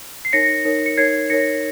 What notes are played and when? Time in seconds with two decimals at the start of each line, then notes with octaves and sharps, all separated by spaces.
0.25 C7
0.33 D#4 A#4 C#5 A#6 C#7
0.65 D#4 A#4 C#5
0.86 C#7
0.97 D#4 A#4 C#5 G#6 C7
1.30 D#4 A#4 C#5 A#6 C#7